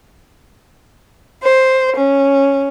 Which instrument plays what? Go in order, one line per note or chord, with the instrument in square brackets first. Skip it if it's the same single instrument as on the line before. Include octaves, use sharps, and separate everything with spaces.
[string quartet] C5
C#4